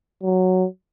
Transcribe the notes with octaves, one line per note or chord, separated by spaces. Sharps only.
F#3